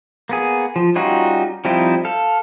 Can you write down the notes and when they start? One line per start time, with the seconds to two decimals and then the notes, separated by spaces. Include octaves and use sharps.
0.29 A#3 B3 G#4
0.76 F3
0.96 G3 C#4 D#4 F4 F#4
1.65 F3 G3 C4 D#4 E4
2.05 A4 F5